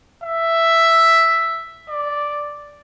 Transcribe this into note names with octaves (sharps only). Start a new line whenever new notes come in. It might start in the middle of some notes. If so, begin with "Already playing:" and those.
E5
D5